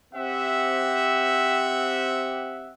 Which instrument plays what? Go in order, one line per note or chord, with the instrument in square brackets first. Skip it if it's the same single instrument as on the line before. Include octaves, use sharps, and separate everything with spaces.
[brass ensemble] C4 G4 E5 F#5